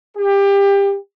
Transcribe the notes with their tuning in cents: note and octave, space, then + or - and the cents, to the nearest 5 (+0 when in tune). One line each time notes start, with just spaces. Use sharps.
G4 +25